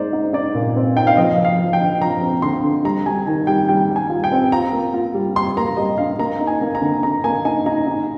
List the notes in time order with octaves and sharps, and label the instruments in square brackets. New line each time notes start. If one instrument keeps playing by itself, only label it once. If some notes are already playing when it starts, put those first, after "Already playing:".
Already playing: [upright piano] G#3 D#4 [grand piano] C5 D5
[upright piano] D#4
[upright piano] D#4 [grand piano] D5
[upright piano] A#2
C4
[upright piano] D#4 [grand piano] G5
[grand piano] F5
[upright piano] F3 [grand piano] D#5
[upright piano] F3
[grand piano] F5
[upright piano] F3
[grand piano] G5
[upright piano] D3
[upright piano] F3 [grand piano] A#5
[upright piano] C4
[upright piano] D3 [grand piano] C6
[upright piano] D3
[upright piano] G3 [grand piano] A#5
[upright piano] G3 [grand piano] G#5
[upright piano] D#3 [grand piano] G#5
[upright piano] G3 [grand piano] G5
[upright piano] G3 [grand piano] G5
[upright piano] G3
[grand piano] G#5
[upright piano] F4
[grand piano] G5
[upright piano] C4
[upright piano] F4 [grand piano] A#5
[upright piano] A#3
F4
G3
[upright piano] G3 [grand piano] C6
[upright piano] A#3 [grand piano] A#5
[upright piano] G3 [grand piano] D#5
[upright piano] D4 [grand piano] F5
[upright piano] A#3 [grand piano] A#5
[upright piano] D#4
[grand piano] G#5
[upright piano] A#3
[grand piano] A#5
[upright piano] D3
[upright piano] D3 [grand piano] A#5
[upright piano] A#3 [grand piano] G#5
[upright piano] D#4 [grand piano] G#5
[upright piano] D#4 [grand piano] A#5
[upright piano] D#4